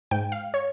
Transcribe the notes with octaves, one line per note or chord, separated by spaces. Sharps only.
G#2 G5
F5
C#5